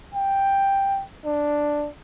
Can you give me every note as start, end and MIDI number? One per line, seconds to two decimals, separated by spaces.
0.14 1.04 79
1.25 1.89 62